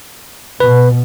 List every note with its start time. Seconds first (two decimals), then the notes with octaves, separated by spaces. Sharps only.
0.60 B2 B4